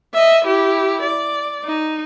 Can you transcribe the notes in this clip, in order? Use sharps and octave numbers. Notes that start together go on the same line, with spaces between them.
D#5 E5
E4 G4
D5
D#4